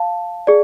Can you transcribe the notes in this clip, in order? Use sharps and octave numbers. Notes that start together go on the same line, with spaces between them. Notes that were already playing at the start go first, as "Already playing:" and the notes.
Already playing: F5 A5
G#4 D5